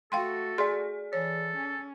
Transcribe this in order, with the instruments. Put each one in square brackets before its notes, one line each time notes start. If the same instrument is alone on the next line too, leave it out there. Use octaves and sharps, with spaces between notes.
[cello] A3 F#4 [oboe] A4 [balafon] F5 G5 C6
[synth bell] G#4 D5 [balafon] C6
[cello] E3 [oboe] A4 [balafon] C#5
[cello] C#4